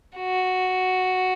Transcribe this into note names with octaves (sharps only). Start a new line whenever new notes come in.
F#4